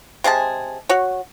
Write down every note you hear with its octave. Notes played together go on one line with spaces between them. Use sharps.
C3 G#3 G#4 A5
F#4 C#5